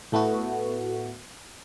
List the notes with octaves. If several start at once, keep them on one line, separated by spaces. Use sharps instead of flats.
A2 A3 B3 F#4